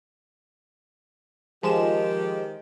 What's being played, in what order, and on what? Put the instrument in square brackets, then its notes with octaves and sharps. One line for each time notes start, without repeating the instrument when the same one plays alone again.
[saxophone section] D#3 G4 [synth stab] F3 G#3 E7